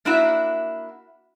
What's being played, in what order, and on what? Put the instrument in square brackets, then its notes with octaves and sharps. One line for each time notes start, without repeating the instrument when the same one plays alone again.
[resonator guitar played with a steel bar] A#3 D4 E4 F#4 E5